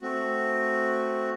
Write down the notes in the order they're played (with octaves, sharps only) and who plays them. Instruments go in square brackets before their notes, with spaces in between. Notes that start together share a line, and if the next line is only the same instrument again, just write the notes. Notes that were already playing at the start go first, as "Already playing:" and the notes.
[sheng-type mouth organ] A3 C4 F#4